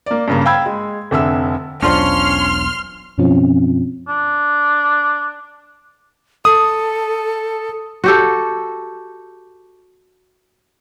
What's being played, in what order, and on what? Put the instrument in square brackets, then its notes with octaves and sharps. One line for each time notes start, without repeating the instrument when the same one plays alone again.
[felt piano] A#3 D5
G2 C#3 A#3
F5 G5 B5 E6 G#6
G#3
F1 D3 E5 E6
[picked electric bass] E1 B1 [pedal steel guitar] C#4 [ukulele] D4 F4 C5 [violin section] C6 F6
[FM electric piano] F#2 B2 F3 C4 C#4 F4
[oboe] D4
[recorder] A4 [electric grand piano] D#6
[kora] F#4 G4 A4